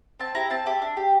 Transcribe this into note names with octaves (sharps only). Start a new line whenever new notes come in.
C4 A5
E4 G4 A#5
C4 A5
E4 G4
D4
G4